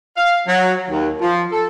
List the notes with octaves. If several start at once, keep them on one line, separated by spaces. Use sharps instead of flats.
F5
F#3
D#2
F3
A4